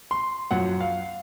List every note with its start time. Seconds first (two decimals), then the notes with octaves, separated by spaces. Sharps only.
0.11 C6
0.51 F#2 F3 F#5
0.81 F5